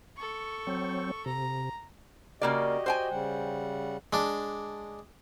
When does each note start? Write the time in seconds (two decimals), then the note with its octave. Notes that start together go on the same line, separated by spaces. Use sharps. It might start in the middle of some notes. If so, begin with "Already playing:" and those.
0.16 A4 C#6
0.67 F#3 C4
1.26 C3 A#5
2.42 C#3 A#3 F#4 G4 D5 D#5
2.86 C5 G5 G#5
3.11 C#3 G3 F#5
4.13 G#3 D4